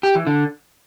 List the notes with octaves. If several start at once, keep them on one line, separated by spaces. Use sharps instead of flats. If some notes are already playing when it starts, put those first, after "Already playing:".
G4
E3
D3